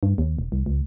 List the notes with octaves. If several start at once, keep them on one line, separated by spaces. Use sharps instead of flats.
G2
D#2
E1
C2
C#2